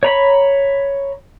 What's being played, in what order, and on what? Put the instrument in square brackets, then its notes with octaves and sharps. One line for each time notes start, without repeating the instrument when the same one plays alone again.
[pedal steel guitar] C#5 A#5 B5